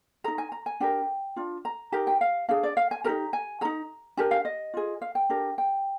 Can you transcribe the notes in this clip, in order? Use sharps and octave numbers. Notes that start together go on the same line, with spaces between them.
D#4 G#4 A#5
G#5
A#5
G#5
D4 G4 A#4 G5
D4 F4
A#5
D#4 G4 A#4 A#5
G5
F5
D4 G#4 F5
D5
F5
G#5
D#4 G4 A#4 A#5
G#5
D#4 G#4 A#5
D4 G4 A#4 G#5
F5
D#5
F4 G#4
F5
G5
D4 G4 A#4
G5